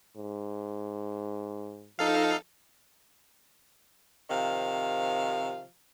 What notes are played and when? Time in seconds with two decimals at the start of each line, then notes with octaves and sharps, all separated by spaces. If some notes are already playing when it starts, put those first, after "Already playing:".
0.16 G#2
1.99 F3 D#4 A4 F5
4.29 C3 D#3 F3 F5